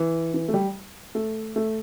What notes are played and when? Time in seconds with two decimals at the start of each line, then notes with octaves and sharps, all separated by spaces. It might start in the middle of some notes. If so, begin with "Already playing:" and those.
Already playing: E3
0.34 E3
0.48 A3
0.54 G3
1.15 A3
1.56 A3